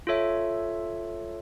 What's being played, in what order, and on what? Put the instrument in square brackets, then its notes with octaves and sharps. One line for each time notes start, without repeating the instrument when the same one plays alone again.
[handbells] F4 A4 C#5 E5